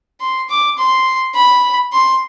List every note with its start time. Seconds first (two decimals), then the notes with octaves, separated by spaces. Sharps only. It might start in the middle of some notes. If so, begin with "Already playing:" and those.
0.21 C6
0.49 D6
0.78 C6
1.35 B5
1.93 C6